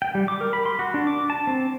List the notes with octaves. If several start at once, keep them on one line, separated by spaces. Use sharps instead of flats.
G5
G3
D6
A#4
B5
C6
F#4
D4
D6
A5
C4